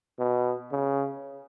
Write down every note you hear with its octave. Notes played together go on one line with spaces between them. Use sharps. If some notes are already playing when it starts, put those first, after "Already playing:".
B2
C#3